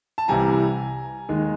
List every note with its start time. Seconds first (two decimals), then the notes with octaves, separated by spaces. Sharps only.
0.18 A5
0.28 C2 C3 E3 G3 G#5 A#5
1.29 D#2 D#3 G#3